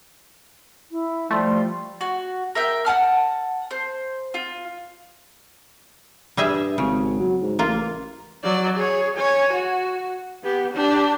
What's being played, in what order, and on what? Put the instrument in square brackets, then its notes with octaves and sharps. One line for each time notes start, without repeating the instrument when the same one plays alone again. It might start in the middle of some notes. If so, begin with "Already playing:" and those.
[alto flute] E4
[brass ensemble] F3 G3 F4 [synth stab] A3 [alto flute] C6
[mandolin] F#4
A#4 E5 G5
F#5 G5 A5 F6
C5
F4
[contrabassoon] G2 [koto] G3 G#4 E5
[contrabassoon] G#1 [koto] C#3
[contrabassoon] F#3
G#2
[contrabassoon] A1 [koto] A#3 F4
[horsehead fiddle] F#3 D5
G#4 C#5
C#5 G#5
F#4
B3 G4
D4 G4